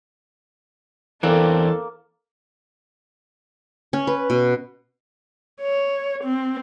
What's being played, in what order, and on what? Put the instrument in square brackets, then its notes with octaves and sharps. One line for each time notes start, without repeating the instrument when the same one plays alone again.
[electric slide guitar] E2 C4 D4 [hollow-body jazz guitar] E3 [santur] A#3 [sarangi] A4
[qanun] C#4
B4
B2
[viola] C#5
C4